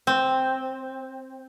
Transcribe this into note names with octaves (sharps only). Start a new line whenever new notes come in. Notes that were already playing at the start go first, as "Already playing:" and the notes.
C4